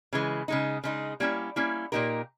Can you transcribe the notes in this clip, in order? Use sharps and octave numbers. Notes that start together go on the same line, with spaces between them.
C#3 E3 G#3
C#3 G#3 D#4
C#3 G#3 D#4
G3 A#3 C#4 E4
G3 A#3 C#4 E4
A#2 A#3 D#4 G4 A#4